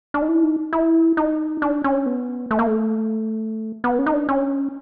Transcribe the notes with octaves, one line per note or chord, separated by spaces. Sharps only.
D4
D#4
E4
D#4
E4
D#4
D4
C#4
B3
A3
A#3
A3
B3
C#4
D#4
D4
C#4